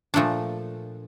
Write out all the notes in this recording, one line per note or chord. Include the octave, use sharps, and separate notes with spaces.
A#2 F3 A3 D4